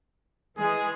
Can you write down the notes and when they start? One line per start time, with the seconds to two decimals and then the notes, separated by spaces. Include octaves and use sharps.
0.58 E3 G#3 G#4